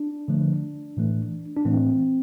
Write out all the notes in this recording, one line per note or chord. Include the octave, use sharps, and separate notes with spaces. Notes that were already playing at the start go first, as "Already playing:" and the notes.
Already playing: D4
D3 F3 A3
A2 E3 A3
D4
A2 E3 A3 C4